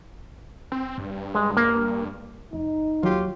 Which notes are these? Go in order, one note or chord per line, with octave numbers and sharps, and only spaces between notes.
C4
G2
G#3 D#5
A#3
F1 D#4
D#2 F#3 F4 G4